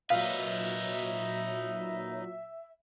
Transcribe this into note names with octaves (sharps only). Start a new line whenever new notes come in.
A#2 F#3 D#4 B4 E5 F5